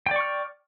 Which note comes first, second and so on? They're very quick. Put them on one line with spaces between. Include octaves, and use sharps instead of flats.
G5 D5 C#6 F6